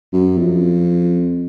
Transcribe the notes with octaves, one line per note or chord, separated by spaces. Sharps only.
F#2
F2